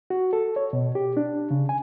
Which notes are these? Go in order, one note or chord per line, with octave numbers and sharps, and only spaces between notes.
F#4
A4
C#5
B2
G4
D4
C#3
G#5